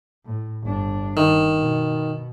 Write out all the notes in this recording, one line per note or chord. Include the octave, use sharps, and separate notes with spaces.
A2
G1 D4
D#3
B2